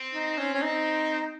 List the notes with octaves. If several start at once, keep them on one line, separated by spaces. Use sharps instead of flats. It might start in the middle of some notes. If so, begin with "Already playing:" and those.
Already playing: C4
D#4
C#4
C#4
D#4